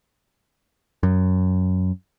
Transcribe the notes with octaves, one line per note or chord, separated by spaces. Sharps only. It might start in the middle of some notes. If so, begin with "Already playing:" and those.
F#2